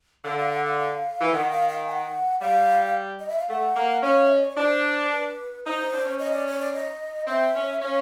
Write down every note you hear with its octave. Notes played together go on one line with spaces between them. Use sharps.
D3 F5
F5
F#5
F5
F5
E3
F5
D#3 F#5
F5
F5
G#5
F#5
G3 F5
D#5
E5
F5
A3 F#5
A#3
C#4 F5
E5
D#5
D5
C#5
D4 C5
B4
D#4 C5
D#4
D4
C#4
D#5
D5
C#5
D5
D#5
C4 E5
C#4
C#4 F5